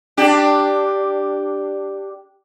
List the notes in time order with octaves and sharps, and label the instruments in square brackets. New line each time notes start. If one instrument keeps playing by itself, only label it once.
[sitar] D4 G4